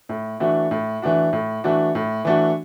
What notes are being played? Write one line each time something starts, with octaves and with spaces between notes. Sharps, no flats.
A2
E3 A3 D4 F#4
A2
E3 A3 D4 F#4
A2
E3 A3 D4 F#4
A2
E3 A3 D4 F#4